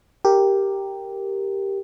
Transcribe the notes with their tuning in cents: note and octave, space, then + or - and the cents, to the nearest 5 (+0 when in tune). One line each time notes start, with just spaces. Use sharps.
G4 +0 A#4 -5